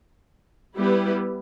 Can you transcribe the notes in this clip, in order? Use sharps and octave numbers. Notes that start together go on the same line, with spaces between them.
G3 B3 E4 G4 B4